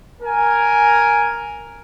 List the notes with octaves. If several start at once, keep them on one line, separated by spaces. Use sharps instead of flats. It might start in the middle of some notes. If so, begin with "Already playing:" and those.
A#4 G#5